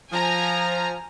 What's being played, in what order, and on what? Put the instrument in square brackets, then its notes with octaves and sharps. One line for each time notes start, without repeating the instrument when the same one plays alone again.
[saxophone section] F3 [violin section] G#5 A#5